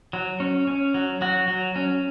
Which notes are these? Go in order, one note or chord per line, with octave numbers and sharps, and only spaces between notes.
F#3
C#4
C#4
F#3
F#3 F#4
F#3
C#4